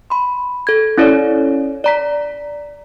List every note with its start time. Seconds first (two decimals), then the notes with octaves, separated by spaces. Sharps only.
0.10 B5 C6
0.67 A4 G#6
0.98 C#4 E4 A4 C#5 D5
1.84 D5 A#5 B6